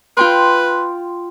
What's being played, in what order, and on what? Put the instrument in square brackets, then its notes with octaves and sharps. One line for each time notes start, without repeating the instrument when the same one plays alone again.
[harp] F4 G5 C6 [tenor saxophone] B4